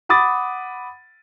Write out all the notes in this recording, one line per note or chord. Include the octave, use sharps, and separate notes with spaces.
F#5 B5 D6 D#6 A6